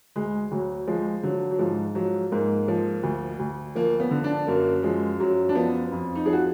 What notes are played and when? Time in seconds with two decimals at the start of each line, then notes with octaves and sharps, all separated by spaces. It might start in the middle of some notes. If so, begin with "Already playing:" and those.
0.16 D2 G#3
0.51 D2 F#3
0.87 F3 G#3
1.23 D3 F#3
1.51 F#3
1.59 G#2 F3
1.95 F3 F#3
2.31 G#2 A#3
2.68 F3
3.03 D2
3.39 D2
3.75 F3 A#3
4.00 B3
4.11 D3
4.24 D4
4.47 F#2 A#3
4.83 F3 G#3
5.20 F#2 F#3
5.49 D4
5.55 F3 B3
5.92 F2
6.16 D#4
6.26 F3 G#4
6.33 F#4